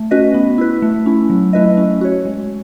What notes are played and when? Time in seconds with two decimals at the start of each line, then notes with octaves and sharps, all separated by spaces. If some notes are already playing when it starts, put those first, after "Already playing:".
Already playing: A3
0.11 C#4 F#4 B4 D#5
0.34 B3
0.58 E4 B4
0.82 A3
1.06 C#4 E4
1.30 F#3
1.53 A3 E4 B4 D#5
1.77 C#4
2.01 F#4 C#5
2.25 G#3